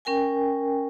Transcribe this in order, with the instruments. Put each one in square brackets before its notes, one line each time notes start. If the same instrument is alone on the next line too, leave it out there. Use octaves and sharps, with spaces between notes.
[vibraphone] C#4 A#4 G5 G#5